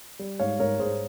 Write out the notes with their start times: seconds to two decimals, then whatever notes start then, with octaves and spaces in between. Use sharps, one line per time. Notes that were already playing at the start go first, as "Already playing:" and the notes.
0.19 G3
0.39 G#2 C#5 F5
0.59 G#2 A#4 C#5
0.79 G#2 G#4 C5